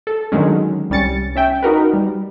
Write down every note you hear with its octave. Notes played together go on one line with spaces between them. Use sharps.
A4
D3 D#3 F#3 G#3 C#4
C2 G3 C#4 A6 C#7
C#4 E5 G5
D#4 F#4 A#4 B4
G3